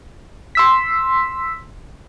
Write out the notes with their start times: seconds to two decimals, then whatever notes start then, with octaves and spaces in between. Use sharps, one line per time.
0.55 C6 E6 B6